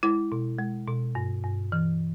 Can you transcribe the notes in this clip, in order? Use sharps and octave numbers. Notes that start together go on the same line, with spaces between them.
G#3 E4
B2
G#3
B2
G2
G2
E3